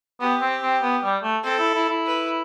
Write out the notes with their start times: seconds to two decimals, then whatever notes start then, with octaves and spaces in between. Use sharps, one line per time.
0.21 B3 G4
0.42 C4
0.62 C4
0.83 B3
1.03 G3
1.23 A3
1.43 C4 A4
1.59 E4
1.74 E4
1.89 E4
2.06 B4